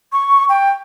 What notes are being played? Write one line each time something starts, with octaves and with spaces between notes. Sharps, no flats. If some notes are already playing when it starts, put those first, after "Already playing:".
C#6
G5